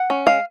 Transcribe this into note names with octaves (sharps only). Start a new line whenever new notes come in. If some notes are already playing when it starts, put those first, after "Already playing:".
Already playing: F#5
C#4
G#3 F5